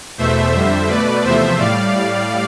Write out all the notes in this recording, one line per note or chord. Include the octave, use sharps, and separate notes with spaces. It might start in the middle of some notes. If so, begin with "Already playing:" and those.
E2 B2 A3 C5 E5
F2 D3 G3
B2 A3 B4 D5
E2 C3 F3 A3 C5 E5
A2 G3 D5 F5